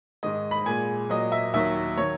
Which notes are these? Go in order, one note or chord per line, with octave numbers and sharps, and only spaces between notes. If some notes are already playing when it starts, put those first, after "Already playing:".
G#2 D#3 G#3 D#5
B5
A#2 G#3 G#5
A#2 F#3 D#5
E5
D#2 D#3 F#3 E5
D#3 F#3 C#5